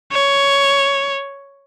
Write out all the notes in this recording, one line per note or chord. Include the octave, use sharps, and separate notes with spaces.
C#5